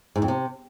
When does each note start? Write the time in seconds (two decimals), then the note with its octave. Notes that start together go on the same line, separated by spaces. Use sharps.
0.16 G#2
0.22 F2
0.28 C3